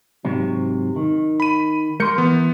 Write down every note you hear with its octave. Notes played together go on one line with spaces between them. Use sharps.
G#2 C3 F#3
D#3
B5 D#7
G#3 A#4 C6 G6 C#7
E3 B3